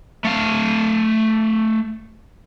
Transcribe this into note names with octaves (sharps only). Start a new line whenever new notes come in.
A3 F5